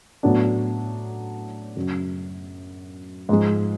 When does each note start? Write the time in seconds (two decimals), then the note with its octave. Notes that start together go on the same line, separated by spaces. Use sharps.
0.23 A2 F#3 B3 D4
1.76 F#2 C#3 F#3
3.29 G#2 F3 G#3